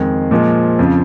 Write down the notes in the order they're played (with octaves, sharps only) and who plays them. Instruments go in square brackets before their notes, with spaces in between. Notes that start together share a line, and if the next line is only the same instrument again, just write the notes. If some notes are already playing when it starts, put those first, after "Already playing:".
Already playing: [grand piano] F2 D#3 G#3
A#2 F3 G#3
F2 C#3 F3